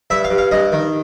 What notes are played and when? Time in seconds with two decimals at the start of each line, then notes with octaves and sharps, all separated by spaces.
0.10 G2 E5
0.24 F5
0.31 G2
0.38 F5
0.51 G2 D#5
0.72 D#3